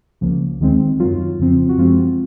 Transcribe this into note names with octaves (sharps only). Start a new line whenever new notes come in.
C#2 C#3 F3 A#3
D#2 D#3 G#3 C4
F#2 D#3 F#3 F4
F2 C#3 F3 C4
F#4
F#2 F3 G#3 C4 F4